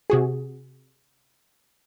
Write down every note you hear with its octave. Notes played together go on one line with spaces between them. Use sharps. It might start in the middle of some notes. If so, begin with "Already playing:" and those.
C3 F#4 G#4